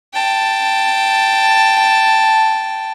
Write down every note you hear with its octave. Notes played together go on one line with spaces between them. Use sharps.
G5 A5